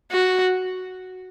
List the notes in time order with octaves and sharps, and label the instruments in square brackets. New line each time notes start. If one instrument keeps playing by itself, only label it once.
[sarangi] F#4